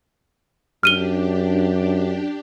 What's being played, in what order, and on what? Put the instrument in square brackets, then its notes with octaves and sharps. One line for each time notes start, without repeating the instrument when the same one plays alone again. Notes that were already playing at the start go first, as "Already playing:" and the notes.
[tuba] F#2 [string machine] D4 G4 [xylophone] F6 D#7 G7